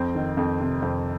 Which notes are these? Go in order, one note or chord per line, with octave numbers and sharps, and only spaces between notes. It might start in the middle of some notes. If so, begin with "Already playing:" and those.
Already playing: F2 C4
D#3
F2
C3
F2 C4